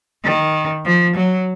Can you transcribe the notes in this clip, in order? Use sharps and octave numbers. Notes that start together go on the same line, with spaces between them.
D#3
F3
F#3